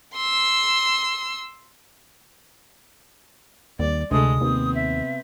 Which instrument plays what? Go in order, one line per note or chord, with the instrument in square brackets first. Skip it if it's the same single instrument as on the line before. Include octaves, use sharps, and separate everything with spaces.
[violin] C6 E6
[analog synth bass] D#2 [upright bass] G3 C4 [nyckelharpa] D5
[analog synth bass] D2 [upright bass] C3 [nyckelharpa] G#3 A3 [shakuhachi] D#6
[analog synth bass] D#2 [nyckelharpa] B3 C4
[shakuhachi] E5